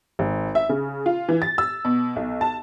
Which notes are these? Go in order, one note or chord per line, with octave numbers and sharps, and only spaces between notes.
G#1
E5
C#3
F4
E3
A6
E6
B2
B1
A5